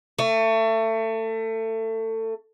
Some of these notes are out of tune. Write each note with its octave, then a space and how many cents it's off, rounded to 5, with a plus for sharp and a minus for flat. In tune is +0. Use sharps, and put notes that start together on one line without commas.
A3 +25